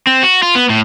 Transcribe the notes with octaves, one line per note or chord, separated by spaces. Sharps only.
C4
F#4
F4
B3
A2